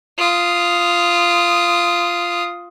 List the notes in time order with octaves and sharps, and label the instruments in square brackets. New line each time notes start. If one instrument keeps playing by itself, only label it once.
[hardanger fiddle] F4 D#6